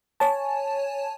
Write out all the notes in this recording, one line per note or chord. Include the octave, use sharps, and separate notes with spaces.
C#5 G#5 A5